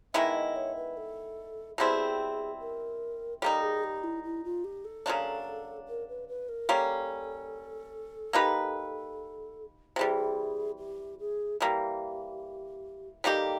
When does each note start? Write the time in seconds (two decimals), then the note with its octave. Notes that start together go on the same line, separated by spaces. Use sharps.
0.14 D#3 G#3 B3 E4 E5
0.36 D#5
0.56 C#5
0.76 B4
0.97 A4
1.78 B2 G3 C4 E4 G#4
2.60 A#4
3.41 G3 A#3 D#4 A4
3.62 G#4
3.83 G4
4.03 E4
4.23 E4
4.44 F4
4.64 G4
4.85 A4
5.06 C#3 F#3 A#3 D4
5.88 A#4
6.08 B4
6.28 B4
6.48 A#4
6.69 G3 A#3 C#4 A4
8.33 A#3 D#4 G4 B4
9.96 C3 E3 G3 G#4
10.78 G4
11.19 G#4
11.60 E3 G3 A#3 G4
13.24 G3 A#3 D#4 G4 A4